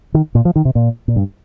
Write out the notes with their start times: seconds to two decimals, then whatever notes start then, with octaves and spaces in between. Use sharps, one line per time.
0.14 D#3
0.35 A#2
0.45 F3
0.56 D#3
0.65 C3
0.75 A#2
1.08 A#2
1.16 G2